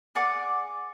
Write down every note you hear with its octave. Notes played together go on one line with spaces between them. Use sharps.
G#4 D5 F#5 D6